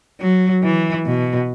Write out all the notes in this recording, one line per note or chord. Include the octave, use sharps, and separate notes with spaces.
F#3
E3
B2